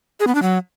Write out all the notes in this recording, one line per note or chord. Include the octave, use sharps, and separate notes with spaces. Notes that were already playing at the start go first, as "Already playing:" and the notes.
G#4
B3
D4
F#3